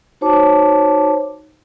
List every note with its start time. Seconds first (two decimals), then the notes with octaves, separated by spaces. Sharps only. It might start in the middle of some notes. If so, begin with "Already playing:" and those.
0.21 D#4 F#4 C5 C#5 A5 D6